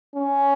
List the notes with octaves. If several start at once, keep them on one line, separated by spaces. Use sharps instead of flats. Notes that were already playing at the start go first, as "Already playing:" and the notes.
C#4